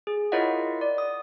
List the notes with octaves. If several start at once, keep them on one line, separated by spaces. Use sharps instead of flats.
G#4
E4 F4 A#4 C#5 D#5 F#5
D5
D#6